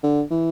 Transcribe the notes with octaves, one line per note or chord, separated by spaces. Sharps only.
D3
E3